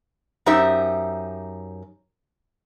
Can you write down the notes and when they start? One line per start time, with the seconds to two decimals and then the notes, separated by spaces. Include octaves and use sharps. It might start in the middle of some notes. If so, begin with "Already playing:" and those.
0.46 F#2 D#4 G4 C5 E5